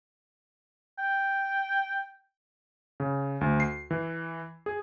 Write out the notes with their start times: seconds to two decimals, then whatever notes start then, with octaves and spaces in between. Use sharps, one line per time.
0.99 G5
3.00 C#3
3.41 D2
3.60 C7
3.91 E3
4.66 G#4